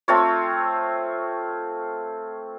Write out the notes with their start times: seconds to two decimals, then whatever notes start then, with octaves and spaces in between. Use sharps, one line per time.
0.08 A3 C4 F4 C#5